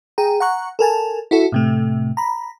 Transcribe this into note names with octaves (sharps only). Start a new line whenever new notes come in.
G#4 G5 A#5
F#5 A#5 C#6 F#6
A4 A#4 G#5 A5
E4 F#4 A4
A2 C3 A3
A#5 B5